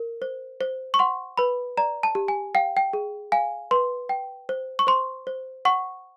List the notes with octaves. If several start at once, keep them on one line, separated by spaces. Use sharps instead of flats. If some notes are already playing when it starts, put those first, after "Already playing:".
Already playing: A#4
C5
C5
C#6
F#5 C6
B4 B5
D5 A#5
A5
G4
G#5
F5 G5
G5
G#4
F5 G#5
B4 C6
G5
C5
C#6
C5 C6
C5
F#5 C#6